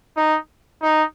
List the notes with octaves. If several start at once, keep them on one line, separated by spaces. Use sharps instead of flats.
D#4
D#4